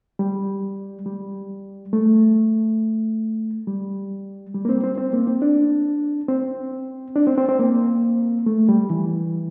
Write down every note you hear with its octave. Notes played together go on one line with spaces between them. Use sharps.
G3
G3
A3
G3
G3
A#3
C4
C4
C4
A#3
C4
D4
C4
D4
C4
C4
C4
A#3
A3
G3
E3